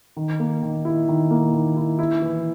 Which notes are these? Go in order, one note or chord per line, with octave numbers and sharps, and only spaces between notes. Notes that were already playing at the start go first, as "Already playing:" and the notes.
D#3
A#3
D#3
E4
D#3
A#3
D#3
E4
E4
E3